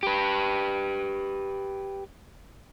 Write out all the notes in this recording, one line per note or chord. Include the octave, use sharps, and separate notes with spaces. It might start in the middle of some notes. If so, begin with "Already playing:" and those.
G4 B4